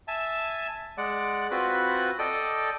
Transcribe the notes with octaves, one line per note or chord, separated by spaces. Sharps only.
E5 G#5 A5
G#3 D5 F#5
C4 F4 F#4 B4 B5
A4 D5 D#5 G5